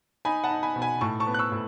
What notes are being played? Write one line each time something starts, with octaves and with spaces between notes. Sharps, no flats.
D#4 G#5 B5
F#5 A5
D#4
G#5 B5
B2
G#5 B5
A2 A5 C#6
A5 C#6
B3
F#6
C#6 E6
A2